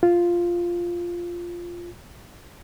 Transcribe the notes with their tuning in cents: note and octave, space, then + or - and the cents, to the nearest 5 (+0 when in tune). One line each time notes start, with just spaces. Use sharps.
F4 -5